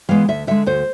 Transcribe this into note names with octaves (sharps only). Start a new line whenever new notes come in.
E3 G#3 B3 F5
D2 E5
D3 G#3 E5
D2 C5